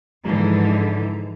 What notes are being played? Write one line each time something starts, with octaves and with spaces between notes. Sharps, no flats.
G#2 D3 E3 F3 G#3 A#5